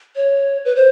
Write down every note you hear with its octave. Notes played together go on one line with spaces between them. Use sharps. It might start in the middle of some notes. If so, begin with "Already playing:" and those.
C#5
B4
C5